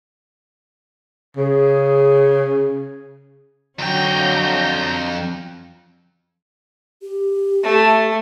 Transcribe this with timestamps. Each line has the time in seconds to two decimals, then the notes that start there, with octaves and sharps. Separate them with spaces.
1.37 C#3 G#4
3.79 F2 D3 F#3 C#4 G5 A#5 G6
7.02 G4
7.63 A3